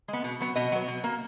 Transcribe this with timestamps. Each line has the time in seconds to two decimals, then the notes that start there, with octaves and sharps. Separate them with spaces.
0.08 G#3
0.13 B3
0.24 B2
0.40 F#3 B3
0.56 B2 D#5
0.72 F#3 B3
0.88 B2
1.04 A#3